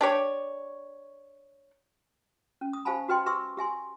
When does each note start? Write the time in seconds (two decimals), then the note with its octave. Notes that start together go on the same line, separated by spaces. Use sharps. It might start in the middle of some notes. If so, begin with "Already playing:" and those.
0.01 D4 G4 C#5
2.61 C#4
2.73 D#6
2.85 G4 C5 F5 G#5 A5 B5
3.08 F#4 G4 B4 D#5 G5 C6
3.26 G4 B4 E5 C6 C#6 E6
3.57 G4 E5 G#5 C6